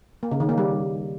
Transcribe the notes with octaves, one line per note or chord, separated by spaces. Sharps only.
A#3
C#3
D#3
A#3
G3